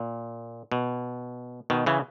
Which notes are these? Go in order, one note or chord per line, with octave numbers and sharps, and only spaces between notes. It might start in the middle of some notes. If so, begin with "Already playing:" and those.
Already playing: A#2
B2
B2 D#3
C#3 E3